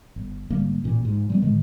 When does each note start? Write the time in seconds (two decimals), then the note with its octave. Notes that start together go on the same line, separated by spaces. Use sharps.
0.16 G1
0.50 G#1 D3 G3 A#3
0.84 A1 A#2
1.05 G#2
1.30 G3 G#3 B3
1.42 A2 D3 D#3 G#3